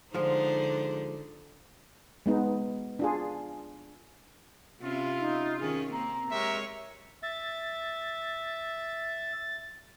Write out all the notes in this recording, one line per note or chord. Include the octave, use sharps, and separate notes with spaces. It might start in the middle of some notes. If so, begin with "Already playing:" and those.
D3 F3 G#3 D#4 C5
G#3 B3 D#4
D4 F4 G#4
C3 C#4 E4 F4
D#4
D#3 C#4 G#4
A#3 C4 A#5
G#3 G4 A#4 C#5 E5
E5 A6